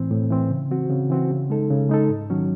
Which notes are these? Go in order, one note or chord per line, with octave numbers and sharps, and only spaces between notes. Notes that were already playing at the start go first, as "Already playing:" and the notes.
Already playing: A2 E3 C4
A2
E3 C4
C#3
E3 C4 F#4
C#3
E3 C4 F#4
C#3
G#3 D#4 A4
C#3
G#3 D#4 A4
G#2
D#3 F#3 C#4